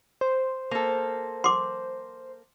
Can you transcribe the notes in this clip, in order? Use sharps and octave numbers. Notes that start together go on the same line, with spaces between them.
C5
A#3 A4
C6 D6